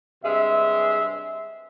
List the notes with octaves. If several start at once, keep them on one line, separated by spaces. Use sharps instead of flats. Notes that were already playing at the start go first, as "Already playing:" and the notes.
G2 C3 G#3 E5